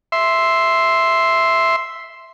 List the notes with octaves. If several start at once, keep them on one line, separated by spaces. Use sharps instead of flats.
E5 C6